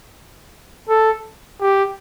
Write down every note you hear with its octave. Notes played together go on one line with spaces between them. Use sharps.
A4
G4